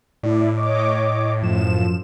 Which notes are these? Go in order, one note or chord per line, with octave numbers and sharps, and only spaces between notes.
A2 E4 D5
C#5 D#5 D6
F#2 F3 E7